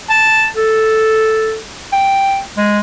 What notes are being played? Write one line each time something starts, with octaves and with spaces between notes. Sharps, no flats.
A5
A4
G5
G#3